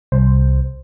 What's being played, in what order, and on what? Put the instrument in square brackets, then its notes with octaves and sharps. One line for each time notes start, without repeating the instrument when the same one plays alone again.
[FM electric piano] C2 C5